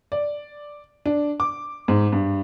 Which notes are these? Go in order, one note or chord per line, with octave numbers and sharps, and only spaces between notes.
D5
D4
D6
G#2
G2